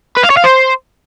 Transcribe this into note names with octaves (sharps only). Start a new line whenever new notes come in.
B4
F5
C#5
F5
C5